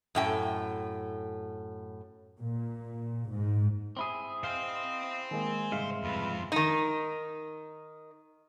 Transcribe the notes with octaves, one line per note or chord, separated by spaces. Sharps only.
F#2 A2 G5
A#2
G#2
C4 E4 G#4
C5 D#5 F5 G5
D#3 G#3 A#3 G#5
C2 G#2 C#3 G#3 E5 F5
F2 F4 B4
D#3 D#4